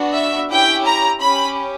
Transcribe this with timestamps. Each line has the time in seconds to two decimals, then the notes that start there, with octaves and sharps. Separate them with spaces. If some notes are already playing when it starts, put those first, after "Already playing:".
Already playing: B3 D4 F#4
0.15 E5
0.50 C#4 E4 G4 G5
0.85 A#5
1.20 C#4 G4 B5